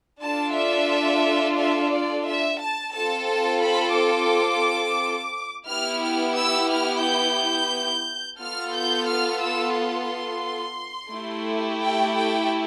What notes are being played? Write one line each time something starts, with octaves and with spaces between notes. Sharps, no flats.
D4 F4 A4 A5
E5
E5
D5
E5
A5
C4 F4 A4 A5
A5
B5
D6
B3 E4 G4 F6
F6
E6
F6
G6
B3 F4 A4 F6
G6
F6
E6
C6
A3 E4 G4
G5
G5